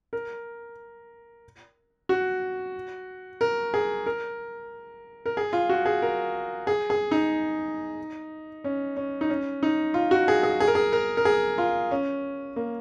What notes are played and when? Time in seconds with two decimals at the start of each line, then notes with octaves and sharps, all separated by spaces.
0.13 A#4
2.09 F#4
3.41 A#4
3.74 G#4
4.06 A#4
5.26 A#4
5.37 G#4
5.53 F4
5.69 F#4
5.86 G#4
6.02 A#4
6.67 G#4
6.90 G#4
7.11 D#4
8.64 C#4
8.97 C#4
9.21 D#4
9.30 C#4
9.63 D#4
9.94 F4
10.11 F#4
10.28 G#4
10.43 G#4
10.60 G#4
10.67 A#4
10.75 G#4
10.93 A#4
11.17 A#4
11.25 G#4
11.58 F4
11.91 C#4
12.56 A#3